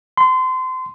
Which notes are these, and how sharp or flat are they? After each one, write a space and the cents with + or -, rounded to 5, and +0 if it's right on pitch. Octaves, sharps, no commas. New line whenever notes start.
C6 -30